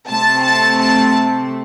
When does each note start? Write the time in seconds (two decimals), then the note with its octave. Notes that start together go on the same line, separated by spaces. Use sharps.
0.08 C3 A3 C4 A5
0.43 A5
0.79 A5